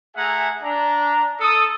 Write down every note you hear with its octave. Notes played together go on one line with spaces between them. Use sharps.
A3 G#4 E5 F#5 G#5 A#5
D4 A#5
A4 D#6